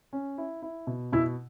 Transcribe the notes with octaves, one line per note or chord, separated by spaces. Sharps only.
C#4
E4
E4
B2
B2 E4